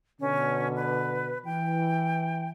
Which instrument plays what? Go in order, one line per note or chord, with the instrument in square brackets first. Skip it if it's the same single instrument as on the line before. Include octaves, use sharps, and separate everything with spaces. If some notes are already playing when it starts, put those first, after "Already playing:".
[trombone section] B2 D3 [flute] C#4
[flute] B4
[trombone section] E3 [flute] G5